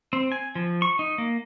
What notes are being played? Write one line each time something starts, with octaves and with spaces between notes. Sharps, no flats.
C4
G#5
F3
C#6
D#4
A#3